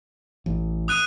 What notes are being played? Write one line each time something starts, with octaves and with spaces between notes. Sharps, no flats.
A1
D#6 F#6 D#7